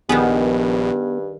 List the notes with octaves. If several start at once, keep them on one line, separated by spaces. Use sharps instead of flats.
A#1 G2 D#3 B3 G#4